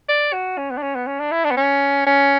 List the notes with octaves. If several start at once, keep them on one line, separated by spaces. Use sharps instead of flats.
D5
F#4
C#4
B3
D4
C#4
B3
C#4
D4
E4
D4
B3
C#4
C#4